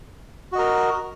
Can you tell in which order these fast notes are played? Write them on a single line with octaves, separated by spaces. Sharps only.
F#4 D#5 A#4